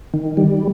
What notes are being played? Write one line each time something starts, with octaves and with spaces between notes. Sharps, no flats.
D#3
G3